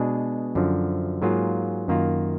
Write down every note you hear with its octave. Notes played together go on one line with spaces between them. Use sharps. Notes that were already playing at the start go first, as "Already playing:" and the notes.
Already playing: B2 G#3 D4 G#4
F#2 D3 F3
G#2 F#3 A#3 F4 G#4
F#2 D#3 A#3 F4